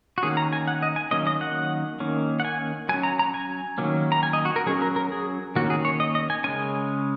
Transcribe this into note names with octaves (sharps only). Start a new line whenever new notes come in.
F#4
D#3 A#3 C#4 G#4
A#5
G#5
F#5
D#5
G#5
D#3 F#3 A#3 C#4 D#5
D#5
F#5
D#3 A#3 C#4
F#5
G#5
F#3 G#5
C#4
A#5
A#5
G#5
D#3 F#3 A#3 C#4
A#5
G#5
D#5
F#4
A#4
F#3 C#4 G#4
A#4
A#4
G#4
D#3 A#3 C#4 F#4
G#4
C#5
D#5
D#5
G#5
C#3 G#3 C#4 G#5